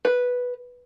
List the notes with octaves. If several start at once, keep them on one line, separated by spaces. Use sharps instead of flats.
B4